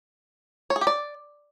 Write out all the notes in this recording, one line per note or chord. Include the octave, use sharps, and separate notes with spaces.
C#5
G#4
G4
D5